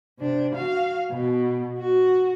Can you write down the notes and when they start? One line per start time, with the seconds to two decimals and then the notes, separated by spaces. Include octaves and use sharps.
0.19 C3 D4
0.55 F#4 F5
1.10 B2
1.79 F#4